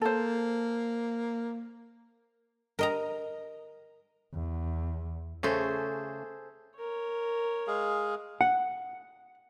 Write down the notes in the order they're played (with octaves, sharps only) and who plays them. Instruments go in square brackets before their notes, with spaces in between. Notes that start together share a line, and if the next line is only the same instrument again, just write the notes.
[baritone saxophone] A#3 [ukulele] A4 C5
[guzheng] A#4 D#5 A#5
[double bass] E2
[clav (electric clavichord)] C#3 A3 C#4 [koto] G#4 A4 C5
[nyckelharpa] A#4 C#5
[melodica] G#3 G#4 F5
[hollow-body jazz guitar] F#5